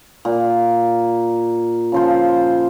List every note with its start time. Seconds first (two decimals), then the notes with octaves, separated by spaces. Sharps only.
0.25 A#2
1.92 C#3 F3 C5